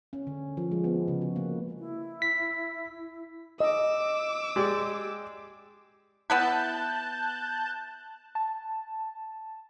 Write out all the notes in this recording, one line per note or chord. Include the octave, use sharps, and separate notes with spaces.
C#4
D3
F3
G#3
B3
C#3
F#4
A#3
E4
B6
D#5 D6 E6
G#3 G4 D5
B3 E4 B4 A5 F#6 G6
A5